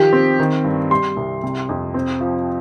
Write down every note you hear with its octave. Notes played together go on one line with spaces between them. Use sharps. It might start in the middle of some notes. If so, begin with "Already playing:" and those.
Already playing: D#3 F3 G4
C4
D#3
G2
G3 C6
C2
C3
F2
C4
F3